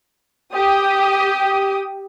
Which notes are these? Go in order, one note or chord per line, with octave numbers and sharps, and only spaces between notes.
G4 D#6